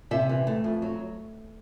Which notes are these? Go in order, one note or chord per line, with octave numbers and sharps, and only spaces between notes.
C3 E5
E3
A3
F2
F#3